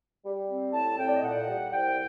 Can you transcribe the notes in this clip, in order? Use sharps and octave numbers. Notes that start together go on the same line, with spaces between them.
G3
C4
A2 A5
A2 G5
D5
D#5
A#2 F#5
G3
C2 G5